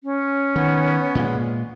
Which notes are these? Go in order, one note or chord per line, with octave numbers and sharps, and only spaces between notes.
C#4
D#3 B3
A#2 G#3